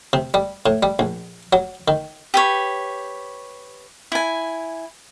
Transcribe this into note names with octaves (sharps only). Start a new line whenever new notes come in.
C3
G3
A2
G3
A#1
F#3
D#3
G4 B4 C#5
E4 G#5